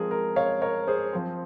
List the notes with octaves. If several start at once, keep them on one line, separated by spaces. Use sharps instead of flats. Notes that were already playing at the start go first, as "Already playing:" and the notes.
Already playing: F3 G#3 C4 G#4 A#4
A#4
C#5 F5
A#4 C#5
G#4 C5
F3 C4